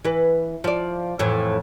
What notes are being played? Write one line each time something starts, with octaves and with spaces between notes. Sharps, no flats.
E3 B4
F3 D5
F2 A2 E3